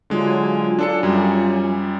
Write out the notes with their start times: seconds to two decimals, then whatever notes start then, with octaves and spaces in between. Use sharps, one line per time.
0.10 D3 F#3 G#3 F4 G#5
0.79 D4 A4 C#7
1.03 F#2 G3